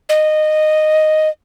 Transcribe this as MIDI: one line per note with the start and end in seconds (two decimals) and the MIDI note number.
0.09 1.29 75